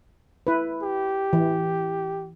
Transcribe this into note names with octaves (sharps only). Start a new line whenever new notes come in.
E4 B4
G4
E3